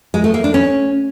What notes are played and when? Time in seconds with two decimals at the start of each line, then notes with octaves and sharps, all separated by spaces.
0.14 G#3
0.24 A3
0.34 A#3
0.44 D4
0.54 C#4